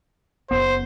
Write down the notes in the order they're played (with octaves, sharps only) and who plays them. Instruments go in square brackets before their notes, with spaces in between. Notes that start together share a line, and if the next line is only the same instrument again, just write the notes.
[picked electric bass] F#1 D#2 B3 [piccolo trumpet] C5